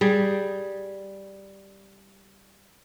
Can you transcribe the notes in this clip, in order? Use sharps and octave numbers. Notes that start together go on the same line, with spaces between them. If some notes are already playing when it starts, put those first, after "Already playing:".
G3 G#4